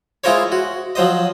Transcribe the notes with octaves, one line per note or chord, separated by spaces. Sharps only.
G#3 E4 F4 A#4 C5 C#5
F#4
F3 F#3 C5 D#5